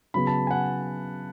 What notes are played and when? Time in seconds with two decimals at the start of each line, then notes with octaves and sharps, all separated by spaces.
0.14 C#3 F#3 B3 B5
0.27 A5
0.47 G#5
0.51 F#5